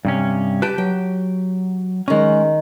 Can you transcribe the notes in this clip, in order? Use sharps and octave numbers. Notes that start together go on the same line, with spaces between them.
G2 C3 C#4
G4 B4 G5 A5
F#3 G5
D#3 G#3 C#4 A#5